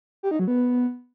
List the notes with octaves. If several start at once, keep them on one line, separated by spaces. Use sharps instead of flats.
G4
D#4
F#3
B3